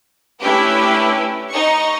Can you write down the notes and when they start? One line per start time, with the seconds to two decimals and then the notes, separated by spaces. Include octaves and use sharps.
0.41 A3 C#4 D4 E4 G4 B4
1.50 D#4 C#6